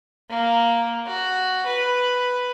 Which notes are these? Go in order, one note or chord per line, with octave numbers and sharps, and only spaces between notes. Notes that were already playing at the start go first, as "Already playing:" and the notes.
A#3
F#4
B4